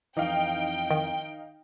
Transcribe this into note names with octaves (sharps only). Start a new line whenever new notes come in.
F2 E3 D#4 F5 G5
D#3